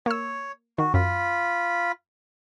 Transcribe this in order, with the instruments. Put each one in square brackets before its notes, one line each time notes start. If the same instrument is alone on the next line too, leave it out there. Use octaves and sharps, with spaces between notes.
[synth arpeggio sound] A#3 E6 [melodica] C#5
[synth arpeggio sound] D#3 [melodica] F#4
[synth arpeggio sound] F#2 [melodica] F4 B5